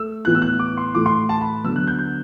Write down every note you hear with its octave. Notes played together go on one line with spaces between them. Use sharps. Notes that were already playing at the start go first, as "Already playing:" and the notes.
Already playing: A3 E6
A2 E3 B3 F#6
E6
F#6
D6
C6
A2 E3 A3 D6
C6
A5
B5
D3 F#3 B3 E6
F#6
G6
G6